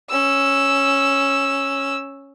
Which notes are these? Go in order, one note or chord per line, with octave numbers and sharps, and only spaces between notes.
C#4 E6